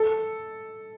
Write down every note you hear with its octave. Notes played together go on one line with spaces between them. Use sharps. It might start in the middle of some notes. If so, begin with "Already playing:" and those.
Already playing: A4